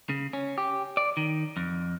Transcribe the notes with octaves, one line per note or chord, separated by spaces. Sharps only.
C#3
C#4
G4
D5
D#3
F2